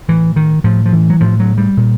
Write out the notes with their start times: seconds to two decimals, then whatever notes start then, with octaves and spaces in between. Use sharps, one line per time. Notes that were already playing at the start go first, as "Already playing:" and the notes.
0.08 A2 E3
0.36 D#3
0.64 A2 F3
0.86 F3
0.93 E3
1.10 F#3
1.21 A2 F3
1.40 F#3
1.58 G3
1.77 A#2